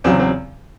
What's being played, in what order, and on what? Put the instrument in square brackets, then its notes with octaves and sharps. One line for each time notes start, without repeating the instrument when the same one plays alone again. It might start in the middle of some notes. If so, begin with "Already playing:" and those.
[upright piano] E2 C#3 F#3 C4
C4